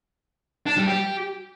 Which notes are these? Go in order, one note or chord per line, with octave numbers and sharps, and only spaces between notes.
D4
G3
G4